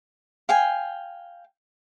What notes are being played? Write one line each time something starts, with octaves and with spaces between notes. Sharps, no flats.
F5 G5 G#5